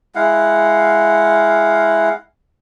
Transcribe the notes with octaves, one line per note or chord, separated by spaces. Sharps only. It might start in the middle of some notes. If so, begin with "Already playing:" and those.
G#3 E4 F5 F#5